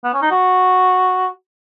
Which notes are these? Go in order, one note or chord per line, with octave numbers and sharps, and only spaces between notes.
B3
C#4
D#4
F#4